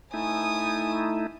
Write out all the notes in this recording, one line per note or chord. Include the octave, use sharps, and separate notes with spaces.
A3 D#4 E4 G#5 D#6